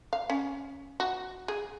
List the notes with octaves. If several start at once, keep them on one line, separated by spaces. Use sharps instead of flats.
F5
C#4
F#4
G#4